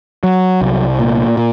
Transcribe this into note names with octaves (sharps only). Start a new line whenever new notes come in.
F#3
C2
A#2
A#2